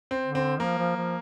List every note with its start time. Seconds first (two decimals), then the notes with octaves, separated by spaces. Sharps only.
0.11 C4
0.23 D3
0.35 C4
0.60 F3 A#3
0.78 F3
0.97 F3